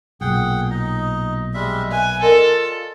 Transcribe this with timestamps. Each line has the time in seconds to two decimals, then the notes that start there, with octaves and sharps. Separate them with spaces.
0.21 B1 A#2 G#4 F#5 G5
0.70 D#4 D#5
1.54 G3 G#3 E5
1.91 B4 E5 G#5
2.22 F4 A4 A#4 D5 D#5